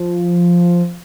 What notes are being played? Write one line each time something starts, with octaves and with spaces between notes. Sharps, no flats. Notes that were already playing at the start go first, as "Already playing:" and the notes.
Already playing: F3